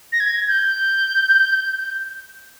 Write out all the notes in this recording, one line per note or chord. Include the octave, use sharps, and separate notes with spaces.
A#6
G#6
G6